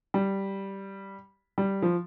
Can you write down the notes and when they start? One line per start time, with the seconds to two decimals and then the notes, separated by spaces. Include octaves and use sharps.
0.14 G3
1.58 G3
1.82 F3